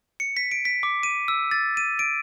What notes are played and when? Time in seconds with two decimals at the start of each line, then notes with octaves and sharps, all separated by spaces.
0.20 C#7
0.37 B6
0.51 D7
0.65 B6
0.83 D6
1.03 D#7
1.28 E6
1.51 A6
1.77 D#7
1.99 D7